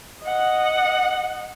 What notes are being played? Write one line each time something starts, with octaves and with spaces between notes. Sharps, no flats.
D#5 F#5